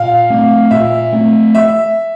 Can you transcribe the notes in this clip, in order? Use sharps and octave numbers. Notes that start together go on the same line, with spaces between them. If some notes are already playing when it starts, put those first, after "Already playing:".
Already playing: A#2 F5
A3 C4
A#2 E5
A3 C4
E5